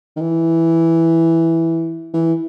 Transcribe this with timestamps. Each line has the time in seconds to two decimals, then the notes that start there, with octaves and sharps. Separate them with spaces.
0.16 D#3
0.21 E3
2.14 E3